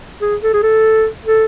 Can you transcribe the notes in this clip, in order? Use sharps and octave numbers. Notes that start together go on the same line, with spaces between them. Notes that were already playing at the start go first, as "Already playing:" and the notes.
G#4
A4
G#4
A4
A4